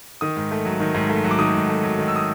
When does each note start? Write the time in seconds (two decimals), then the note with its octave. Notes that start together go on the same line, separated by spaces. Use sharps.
0.21 D#3 D#6
0.37 G#2
0.51 A3
0.65 F#3
0.80 D#3
0.95 G#2
1.09 A3
1.24 F#3
1.31 D6
1.39 D#3 D#6
1.55 G#2
1.69 A3
1.83 F#3
1.99 D#3
2.08 E6
2.16 D#6